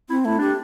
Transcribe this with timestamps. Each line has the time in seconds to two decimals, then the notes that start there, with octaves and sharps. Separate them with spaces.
0.10 C4 E4
0.25 A3 E4
0.38 D4 G4